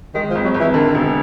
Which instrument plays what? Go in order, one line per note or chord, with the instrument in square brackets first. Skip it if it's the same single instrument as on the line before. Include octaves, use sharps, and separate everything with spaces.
[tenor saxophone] D#3 [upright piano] G#3
[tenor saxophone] F3
[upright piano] G#1
[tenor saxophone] F#3
[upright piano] G#1 [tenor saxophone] E3
[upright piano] D3 [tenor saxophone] D#3
[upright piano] E1